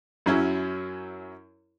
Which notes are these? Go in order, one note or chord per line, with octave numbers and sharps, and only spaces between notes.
F#2 F#3 C#4 E4